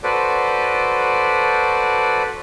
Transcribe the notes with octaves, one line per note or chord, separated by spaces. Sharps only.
F#4 A4 B4 C5 D5